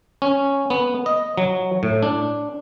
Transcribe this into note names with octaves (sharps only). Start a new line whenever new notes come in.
C#4
B3
D#5
F#3
A2
D4